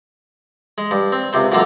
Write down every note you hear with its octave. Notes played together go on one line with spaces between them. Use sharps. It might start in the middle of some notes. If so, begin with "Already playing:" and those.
G#3
G2
C4
C#2 C3 C5
C#2 F#2 A#3 F4 F#4 A4